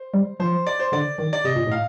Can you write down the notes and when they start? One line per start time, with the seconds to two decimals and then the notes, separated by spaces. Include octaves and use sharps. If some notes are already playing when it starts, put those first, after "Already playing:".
Already playing: C5
0.14 G3
0.40 F3 C5
0.67 D5
0.80 C5
0.92 D3 D5
1.18 D#3
1.33 D5
1.45 C3 D#5
1.56 A#2
1.67 A2 F5